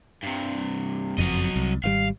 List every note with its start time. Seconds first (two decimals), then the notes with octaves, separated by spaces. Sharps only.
0.23 G2 C3
1.18 F#1 F2 F#3 D#5
1.56 C2
1.84 G#1 D#3 G3 F5